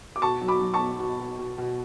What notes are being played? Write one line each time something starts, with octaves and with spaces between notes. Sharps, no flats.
D6
B2 A5 C#6
F#3
B5 D6
F#3
A5 C#6
B2
B2
B2
B2
B2